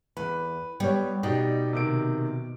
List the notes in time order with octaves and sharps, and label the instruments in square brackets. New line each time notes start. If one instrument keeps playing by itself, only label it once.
[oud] E2 [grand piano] B4
[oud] G3 [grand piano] B3 G4 C#5
[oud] B2 [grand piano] D#4 G4 D5
[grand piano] C3 D#3 D7